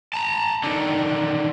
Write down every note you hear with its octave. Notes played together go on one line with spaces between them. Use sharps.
A5 A#5
D3 D#3